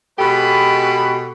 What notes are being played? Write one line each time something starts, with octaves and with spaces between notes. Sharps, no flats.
B2 G#3 G4 A4 B4 B5